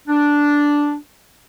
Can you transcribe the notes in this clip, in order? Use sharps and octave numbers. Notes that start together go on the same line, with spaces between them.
D4